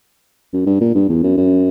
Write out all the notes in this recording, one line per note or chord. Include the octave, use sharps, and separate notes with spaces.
F#2
G2
A#2
G2
E2
F#2
F#2